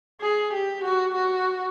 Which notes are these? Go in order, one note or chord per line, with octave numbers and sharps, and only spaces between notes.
G#4
G4
F#4
F#4